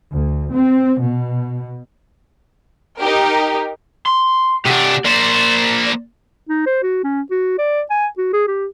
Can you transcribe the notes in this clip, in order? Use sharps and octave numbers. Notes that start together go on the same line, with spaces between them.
D2
C4
B2
D#4 G4 A#4
C6
C3 D4 G4 F#5
A#3 C5 D5
D#4
C5
F#4
C#4
F#4
D5
G#5
F#4
G#4
G4